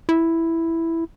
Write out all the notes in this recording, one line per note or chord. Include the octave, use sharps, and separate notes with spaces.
E4